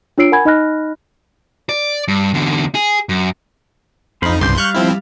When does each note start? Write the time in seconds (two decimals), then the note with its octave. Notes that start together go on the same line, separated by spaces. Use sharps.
0.18 D4 F4 C#5 E6 C7 D7
0.32 A#4 F#5 G#5 B5 G#6
0.45 D#4 D#5 B5 F6 F#6 A#6
1.69 D5
2.08 G2
2.34 E2 D3
2.75 G#4
3.09 F#2
4.22 F2 D#4 F4 C5 B5
4.41 C2 G2 C#3 C6 D6 G6
4.57 G3 F5 C#6 F#6 G6
4.74 F3 C4 E4